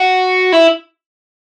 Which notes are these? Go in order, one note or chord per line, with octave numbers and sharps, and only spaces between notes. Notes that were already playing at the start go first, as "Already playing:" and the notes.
Already playing: F#4
E4